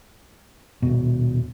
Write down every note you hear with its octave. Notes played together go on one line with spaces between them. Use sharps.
D#1 B2